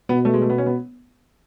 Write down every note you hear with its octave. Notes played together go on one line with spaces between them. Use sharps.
B2 B3
A3
G#3
A3
B3
C#4
B3